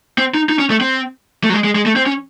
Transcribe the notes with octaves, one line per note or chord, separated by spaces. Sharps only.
C4
D#4
D#4
C#4
A3
C4
A3
F#3
G#3
G#3
G#3
A3
C4
C#4